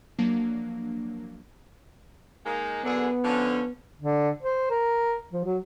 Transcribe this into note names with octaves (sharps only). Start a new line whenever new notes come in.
F3 F#3 A#3 D4
G#3 A#3 D#4
F#2 D3 B3 G#4
D3 F3 C#4
D3
C5
A#4
F3
F#3